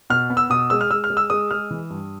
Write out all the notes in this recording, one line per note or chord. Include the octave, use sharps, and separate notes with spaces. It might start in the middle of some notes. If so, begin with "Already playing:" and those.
B2 F6
B3
E6
B2 D#6
G#3 E6
F6
G#3 E6
F6
G#3
E6
G#3 D#6
G#3 F6
E3
G2